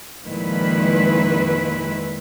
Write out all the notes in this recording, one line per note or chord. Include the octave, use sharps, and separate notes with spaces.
F2 A#2 D#3 G#3 E4 B4